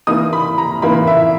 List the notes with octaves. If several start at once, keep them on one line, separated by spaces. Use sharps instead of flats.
E3 A#3 D#4 D#6
B5
A#5
E3 A#3 D#4 B5
E5